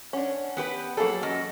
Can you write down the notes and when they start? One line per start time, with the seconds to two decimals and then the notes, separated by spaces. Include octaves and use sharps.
0.13 C#4 D4 F#5
0.57 B3 G4 B4
0.97 F#3 A#3 G#4 A4 F#5
1.23 F#2 D#5